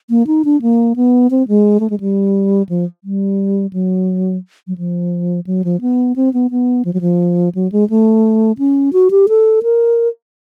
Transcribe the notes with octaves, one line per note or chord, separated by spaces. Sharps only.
A#3
D#4
D4
A#3
B3
C4
G#3
A3
G#3
G3
F3
G3
F#3
F#3
F3
F#3
F3
B3
C4
B3
B3
F3
F#3
F3
F#3
G#3
A3
C#4
F#4
G4
A4
A#4